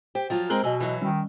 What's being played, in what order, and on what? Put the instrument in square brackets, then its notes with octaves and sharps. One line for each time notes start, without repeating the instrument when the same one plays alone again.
[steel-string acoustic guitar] G4 [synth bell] C5
[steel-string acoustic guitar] F3 F#3 F4
[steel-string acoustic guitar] G#3 C4 G#4 [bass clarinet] A#4 [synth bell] F#6 F#7 G7
[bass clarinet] B2 [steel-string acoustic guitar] F#3 [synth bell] D#5 G#5 E6
[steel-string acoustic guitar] E3 F#3
[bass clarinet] D#3 [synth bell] G3 C#4